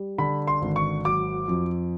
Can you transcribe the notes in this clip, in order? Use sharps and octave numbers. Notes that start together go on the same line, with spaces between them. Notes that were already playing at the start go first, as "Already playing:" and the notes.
Already playing: G3
D3 B5
C6
G#1
C#6
F#3 D6
F2